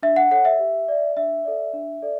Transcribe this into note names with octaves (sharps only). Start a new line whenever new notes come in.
D4 E5
F#5
A4 C#5 F#5
E5
G4
D5
D4 E5
A4 D5
D4
A4 D5